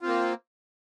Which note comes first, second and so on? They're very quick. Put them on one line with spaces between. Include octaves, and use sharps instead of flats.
F4 C4 A#3